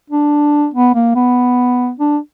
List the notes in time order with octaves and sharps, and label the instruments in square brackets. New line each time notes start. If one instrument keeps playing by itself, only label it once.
[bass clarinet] D4
B3
A#3
B3
D4